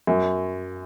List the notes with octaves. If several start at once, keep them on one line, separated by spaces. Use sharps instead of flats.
F#2